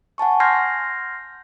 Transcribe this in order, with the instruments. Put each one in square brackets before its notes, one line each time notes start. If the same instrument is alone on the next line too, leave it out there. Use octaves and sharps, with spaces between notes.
[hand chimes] F#5 G#5 A5 C#6
C6 F6 G6 G#6 A#6 C7